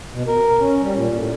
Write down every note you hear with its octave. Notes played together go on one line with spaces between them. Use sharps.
B2
A#4
C#4
G3
A#2
A2